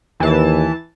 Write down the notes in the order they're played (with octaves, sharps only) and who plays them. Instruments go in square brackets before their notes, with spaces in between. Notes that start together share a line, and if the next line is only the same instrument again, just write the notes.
[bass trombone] D#2 [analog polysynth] E3 A5